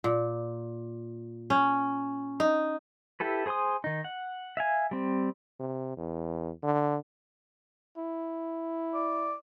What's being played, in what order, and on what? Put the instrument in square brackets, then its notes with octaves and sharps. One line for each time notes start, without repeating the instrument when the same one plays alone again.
[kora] A#2
C#4
D#4
[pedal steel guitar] E4 G4 A4 B4
G#4 C5 G#5 C6 D#6
D#3 D#4
F#5
E5 F5 G#5
G3 C4
[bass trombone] C3
E2
D3
[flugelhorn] E4
[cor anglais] D5